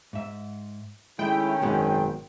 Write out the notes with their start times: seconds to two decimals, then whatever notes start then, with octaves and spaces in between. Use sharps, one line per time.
0.13 G#2 E5
1.19 D#3 G#3 A3 C#4 E4 G5
1.61 G#1 F#2 B2 G#3